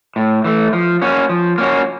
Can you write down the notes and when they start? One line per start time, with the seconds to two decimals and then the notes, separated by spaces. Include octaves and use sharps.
0.16 A2
0.44 E3 A3
0.73 F3
1.02 A#3 C#4 F#4
1.29 F3
1.58 A#3 C#4 F#4